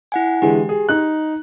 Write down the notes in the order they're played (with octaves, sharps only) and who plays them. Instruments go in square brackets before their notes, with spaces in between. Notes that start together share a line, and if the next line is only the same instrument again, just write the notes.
[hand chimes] E4 F#5 G#5
[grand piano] D3 E3 G#3 [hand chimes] G4
[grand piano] G#4
D#4 F#6